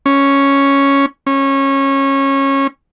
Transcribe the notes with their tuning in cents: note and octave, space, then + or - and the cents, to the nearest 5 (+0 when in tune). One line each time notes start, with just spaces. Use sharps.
C#4 +0
C#4 -20